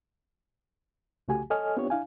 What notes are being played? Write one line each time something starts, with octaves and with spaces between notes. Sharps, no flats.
C2 C#3 A3 F#4 G4 G#5
A4 C#5 D#5 G#5 F6
B3 C4 D4 F4 G4 C#5
D4 E4 F5 G#5